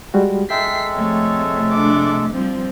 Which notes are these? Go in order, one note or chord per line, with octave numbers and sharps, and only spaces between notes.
G3 G#3 F#4
G#3 A4 E5 G5 B6 C7
F2 C3 A3 C#5
D4 D6
F3 G3 C4